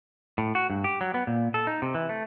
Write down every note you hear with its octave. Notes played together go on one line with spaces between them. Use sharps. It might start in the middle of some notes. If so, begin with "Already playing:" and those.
A2
F#4
G2
G4
F#3
B3
A#2
A4
D#4
C3
E3
A3